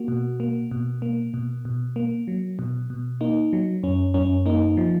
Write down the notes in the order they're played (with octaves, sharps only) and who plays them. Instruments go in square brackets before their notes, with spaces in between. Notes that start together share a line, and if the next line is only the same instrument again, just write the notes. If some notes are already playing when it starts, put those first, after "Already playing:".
Already playing: [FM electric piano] A#3 F#4
B2
A#3
B2
A#3
B2
B2
A#3
F#3
B2
B2
A#3 D#4
F#3
F#2 C#4
F#2 C#4
A#3 D#4
F3